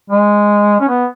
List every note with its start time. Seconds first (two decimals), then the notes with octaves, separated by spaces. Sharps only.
0.10 G#3
0.80 C#4
0.88 B3